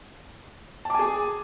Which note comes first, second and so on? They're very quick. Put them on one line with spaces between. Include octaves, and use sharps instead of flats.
A5 D6 G#5 G#4